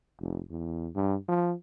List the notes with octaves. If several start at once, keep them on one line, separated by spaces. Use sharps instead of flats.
F1
E2
G2
F3